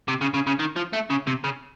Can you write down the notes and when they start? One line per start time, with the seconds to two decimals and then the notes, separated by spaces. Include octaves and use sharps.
0.08 C3
0.21 C#3
0.34 C#3
0.47 C#3
0.59 D#3
0.76 F3
0.93 A3
1.10 C#3
1.27 C3
1.44 C#3